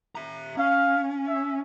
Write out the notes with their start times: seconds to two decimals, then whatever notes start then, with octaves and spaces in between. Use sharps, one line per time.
0.15 E5 A#5
0.57 C#4 F5
1.27 E5